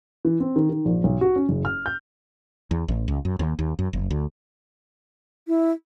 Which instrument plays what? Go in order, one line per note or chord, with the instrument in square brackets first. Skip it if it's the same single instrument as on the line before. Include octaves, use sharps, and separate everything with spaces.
[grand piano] E3
C4
D#3
D#3
A#1
B1
F#4
C#4
F#1
F6
G6
[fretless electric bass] E2
A1
C#2
F#2
D#2
D#2
F#2
F#1
D2
[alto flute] E4